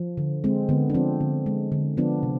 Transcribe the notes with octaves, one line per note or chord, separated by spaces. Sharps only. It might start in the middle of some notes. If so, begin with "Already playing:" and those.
Already playing: F3
D3
G#3 C4
D3 B3
D4
F3 C4
D3
G#3
D3
F3 B3 D4
C3